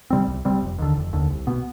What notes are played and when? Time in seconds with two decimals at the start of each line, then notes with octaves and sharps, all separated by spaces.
0.10 C3 G3 C4
0.27 C2
0.45 C3 G3 C4
0.62 F1
0.78 D#2 D3
0.96 F1
1.13 D#2 D3
1.30 C2
1.47 B2 B3